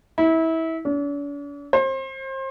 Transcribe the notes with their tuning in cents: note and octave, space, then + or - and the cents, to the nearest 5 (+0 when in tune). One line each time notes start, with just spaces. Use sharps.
E4 -25
D4 -45
C5 +30